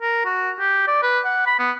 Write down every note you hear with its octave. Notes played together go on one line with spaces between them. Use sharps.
A#4
F#4
G4
D5
B4
F#5
B5
B3